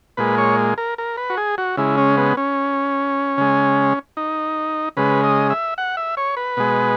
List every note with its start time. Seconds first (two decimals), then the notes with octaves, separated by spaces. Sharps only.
0.17 A#2 G#3 B4
0.38 C#5
0.78 A#4
0.98 A#4
1.17 B4
1.30 F#4
1.37 G#4
1.58 F#4
1.77 C#3 G#3 E4
1.98 C#4
2.18 B3
2.37 C#4
3.37 C#3 G#3
4.17 D#4
4.97 C#3 G#3 B4
5.24 D#5
5.50 E5
5.78 F#5
5.97 E5
6.17 C#5
6.37 B4
6.57 B2 G#3